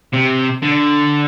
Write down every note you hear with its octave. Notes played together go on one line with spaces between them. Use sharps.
C3
D3